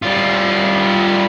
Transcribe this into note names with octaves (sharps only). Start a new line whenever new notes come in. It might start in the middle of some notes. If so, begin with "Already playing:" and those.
G3 F4